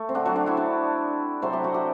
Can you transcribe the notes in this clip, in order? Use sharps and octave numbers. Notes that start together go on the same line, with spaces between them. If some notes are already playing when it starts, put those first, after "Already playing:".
Already playing: A3
C4
D3 D4
F#3 F#4
D4 D5
E4 E5
D4 D5
C3 F#3 A3 C4 C5
G4 G5
F#4 F#5
G4 G5